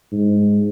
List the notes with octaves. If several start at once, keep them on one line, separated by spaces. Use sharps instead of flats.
G#2